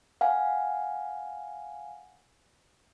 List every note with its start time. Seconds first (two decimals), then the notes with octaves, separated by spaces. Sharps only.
0.21 F5 F#5 G#5